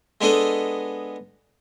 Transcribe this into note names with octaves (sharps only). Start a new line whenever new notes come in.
G#3 B3 D4 A4 D#5